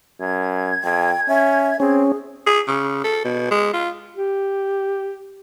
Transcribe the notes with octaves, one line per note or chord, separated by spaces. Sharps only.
F#2 G#6
F2 G5
C#4 E5
C4 C#4 G#4
G#4
C#3
A4
B2
G#3
F4
G4